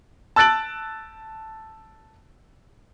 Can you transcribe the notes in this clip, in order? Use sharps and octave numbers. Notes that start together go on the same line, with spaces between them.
A5 E6 F#6 A6 D7 F#7